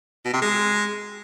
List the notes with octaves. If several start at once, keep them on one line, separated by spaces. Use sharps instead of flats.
B2
C3
G#3